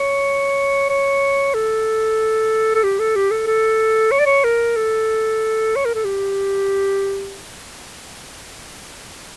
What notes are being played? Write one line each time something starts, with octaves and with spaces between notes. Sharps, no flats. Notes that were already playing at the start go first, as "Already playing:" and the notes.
Already playing: C#5
C#5
A4
A4
G4
A4
G4
A4
A4
C#5
D5
C#5
A#4
A4
C#5
A#4
A4
G4